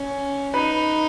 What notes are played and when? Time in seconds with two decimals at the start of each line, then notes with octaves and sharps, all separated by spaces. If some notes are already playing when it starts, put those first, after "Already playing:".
Already playing: C#4
0.53 D#4 B4